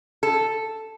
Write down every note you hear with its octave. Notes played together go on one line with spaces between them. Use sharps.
A4